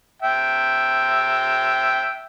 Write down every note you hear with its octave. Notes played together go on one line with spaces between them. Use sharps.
E5 G5